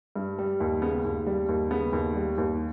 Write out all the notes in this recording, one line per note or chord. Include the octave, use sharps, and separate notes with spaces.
G2
G3
D#2
C#3 B3
D#2
G3
D#2
C#3 B3
D#2
G3
D#2